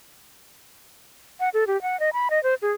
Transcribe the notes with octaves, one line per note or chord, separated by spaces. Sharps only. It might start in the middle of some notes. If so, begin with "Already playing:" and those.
F#5
A4
G4
F#5
D#5
B5
D#5
C5
G#4